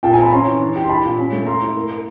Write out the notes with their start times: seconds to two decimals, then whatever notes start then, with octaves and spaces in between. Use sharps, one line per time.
0.03 A#2 G5 A5
0.13 G#5 A#5
0.17 C4
0.22 A5 B5
0.32 C#4 A#5 C6
0.47 E3
0.61 D4
0.76 G4
0.84 C6
0.90 D4 A5 B5
1.04 A#2
1.19 C#4
1.32 A3
1.47 A4 A#5 C6
1.61 E4
1.76 A#3
1.91 A#3